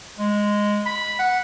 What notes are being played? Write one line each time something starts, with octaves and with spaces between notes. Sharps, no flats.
G#3
B5
F#5